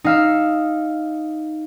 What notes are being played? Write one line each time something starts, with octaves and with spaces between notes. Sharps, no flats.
D#4 F5 E6